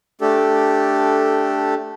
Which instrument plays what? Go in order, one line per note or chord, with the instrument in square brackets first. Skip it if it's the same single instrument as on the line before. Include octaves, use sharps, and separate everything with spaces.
[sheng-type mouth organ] A3 D4 G4 A4